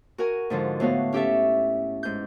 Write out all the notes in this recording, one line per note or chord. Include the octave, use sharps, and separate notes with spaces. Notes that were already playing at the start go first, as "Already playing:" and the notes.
F#4 A#4 G#5
G#2 D3 F3
A2 B3 F#4 F5
C#4 G4 A4 E5
G#2 G6